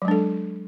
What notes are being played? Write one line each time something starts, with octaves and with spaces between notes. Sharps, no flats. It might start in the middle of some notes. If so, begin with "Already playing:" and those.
F#3 G#3 D4 A4